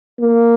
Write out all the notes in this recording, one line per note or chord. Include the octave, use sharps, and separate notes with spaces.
A#3